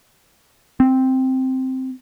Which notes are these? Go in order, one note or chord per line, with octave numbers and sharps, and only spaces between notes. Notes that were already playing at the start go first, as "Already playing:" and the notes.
C4